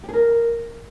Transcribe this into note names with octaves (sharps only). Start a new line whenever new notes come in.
G4
G#4
A#4